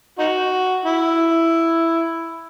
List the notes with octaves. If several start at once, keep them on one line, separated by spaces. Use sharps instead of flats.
D#4 F#4
E4